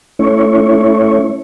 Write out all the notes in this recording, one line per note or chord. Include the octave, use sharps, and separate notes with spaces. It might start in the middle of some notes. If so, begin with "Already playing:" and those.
A3 C#4 E4 C#5